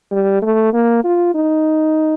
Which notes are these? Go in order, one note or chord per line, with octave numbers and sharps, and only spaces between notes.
G3
A3
A#3
F4
D#4